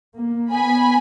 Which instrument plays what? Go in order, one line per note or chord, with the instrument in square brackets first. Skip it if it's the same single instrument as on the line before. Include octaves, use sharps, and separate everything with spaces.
[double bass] A#3
[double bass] B3 [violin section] G#5 B5